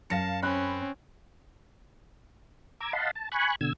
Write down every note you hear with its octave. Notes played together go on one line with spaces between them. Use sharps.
F#2 F5 A5 A#6 C#7
C4 C#4 B5 F#6
A#5 D6 E6 G#6
D#5 F5 F#5 A5 B5 C6
A5
G#5 B5 C#6 F#6
B2 D3 E6 G#6